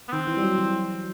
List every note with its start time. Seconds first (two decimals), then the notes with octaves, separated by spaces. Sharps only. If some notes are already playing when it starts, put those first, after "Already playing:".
0.09 B3
0.12 D#3 C4
0.27 E3
0.37 G3
0.42 F#3
0.58 E3